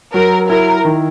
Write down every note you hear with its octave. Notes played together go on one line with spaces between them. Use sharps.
F#3 A#4
E4 A#4
D#3